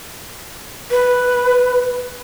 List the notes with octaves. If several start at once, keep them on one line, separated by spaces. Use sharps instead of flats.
B4